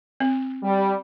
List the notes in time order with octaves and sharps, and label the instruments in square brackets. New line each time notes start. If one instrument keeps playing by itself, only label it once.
[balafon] C4
[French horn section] G3